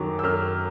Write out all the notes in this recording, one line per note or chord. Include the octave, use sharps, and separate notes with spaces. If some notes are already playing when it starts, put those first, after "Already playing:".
Already playing: F#2 D#3 F#3 C#6 D6
E6
F#2 F6